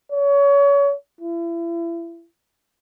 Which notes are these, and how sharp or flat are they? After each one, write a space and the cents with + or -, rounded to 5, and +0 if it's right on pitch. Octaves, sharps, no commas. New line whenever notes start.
C#5 +30
E4 +35